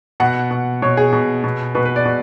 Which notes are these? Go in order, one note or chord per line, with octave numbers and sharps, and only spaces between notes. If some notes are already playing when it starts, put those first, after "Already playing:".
B2 F#5
B2
B2 C#5
G#4
B2
B2
B2 B4
B4
D5
B2